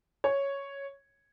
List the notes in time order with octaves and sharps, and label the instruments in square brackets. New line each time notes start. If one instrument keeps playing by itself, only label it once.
[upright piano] C#5